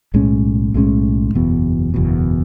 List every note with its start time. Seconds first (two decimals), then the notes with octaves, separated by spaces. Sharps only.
0.14 B1 A2 G#3 C#4
0.74 B1 A2 G#3 C#4
1.34 F#1 E2 B2
1.94 F#1 E2 B2